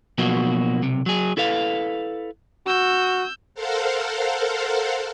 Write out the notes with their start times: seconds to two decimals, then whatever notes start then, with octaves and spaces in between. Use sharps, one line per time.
0.18 B2 F3 F#3 A#3 F#4
0.82 B1 C3
1.06 F#3 G#4
1.37 E4 A4 B4 F5
2.67 F#4 E6 G6
3.55 A4 A#4 C5 F5 F#5